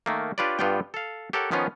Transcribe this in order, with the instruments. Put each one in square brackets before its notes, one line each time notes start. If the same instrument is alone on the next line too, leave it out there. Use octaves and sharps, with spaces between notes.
[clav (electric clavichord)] D#3 A3 A#3
D4 F4 G4 B4 C#5 D5
G2 B3 F4 G4 D5 G5
A4 F5
G4 A4 A#4 C#5 F#5
D#3 F3 B3 C#4 F4